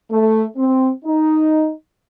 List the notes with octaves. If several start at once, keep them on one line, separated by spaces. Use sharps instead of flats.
A3
C4
D#4